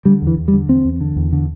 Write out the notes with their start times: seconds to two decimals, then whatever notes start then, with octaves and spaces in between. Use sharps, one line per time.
0.05 D3 G3
0.22 E2
0.27 E3
0.37 E2
0.48 G3
0.53 D3
0.69 E2 C4
0.85 E2
1.01 D3
1.16 E2
1.33 D3